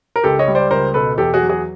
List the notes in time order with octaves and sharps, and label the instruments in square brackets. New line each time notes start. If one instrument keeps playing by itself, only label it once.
[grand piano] A#4
C#2 G4 A4
C#5 D#5
G3
C5 D5
C#2 A#4 C5
B2 A4 B4
E2 G4 A4
F#4 G#4
F#3
F#4 G#4